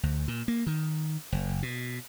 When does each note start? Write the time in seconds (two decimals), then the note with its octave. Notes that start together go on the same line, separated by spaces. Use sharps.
0.03 D2
0.28 A#2
0.48 A#3
0.67 D#3
1.32 F#1
1.63 B2